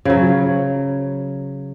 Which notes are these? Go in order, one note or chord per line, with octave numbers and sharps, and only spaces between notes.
C#3 F#3